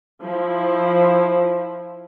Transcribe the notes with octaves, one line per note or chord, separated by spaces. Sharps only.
F3 E4